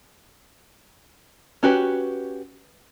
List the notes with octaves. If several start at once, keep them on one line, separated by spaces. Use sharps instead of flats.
C#4 F#4 G4 B4